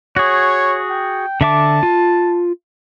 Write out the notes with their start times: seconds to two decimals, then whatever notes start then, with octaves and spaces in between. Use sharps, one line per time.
0.16 F#4 G#4 C#5
0.90 G5
1.41 D3 E5 A5 D6
1.83 F4